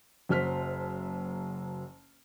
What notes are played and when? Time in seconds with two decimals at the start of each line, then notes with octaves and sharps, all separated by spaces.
0.29 F#1 F#3 C5 F6 B6